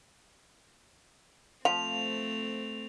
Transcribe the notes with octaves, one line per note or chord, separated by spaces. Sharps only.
F3 A3 C4 F5 F7